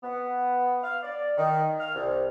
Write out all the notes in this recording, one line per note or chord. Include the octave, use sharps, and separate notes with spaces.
B3
F5
D5
D#3
F6
C2